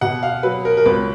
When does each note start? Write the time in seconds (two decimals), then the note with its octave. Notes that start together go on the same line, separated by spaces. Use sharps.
0.01 B2 F#5
0.23 F5
0.43 F#3 B4
0.65 A#4
0.77 A#4
0.85 C#2 B4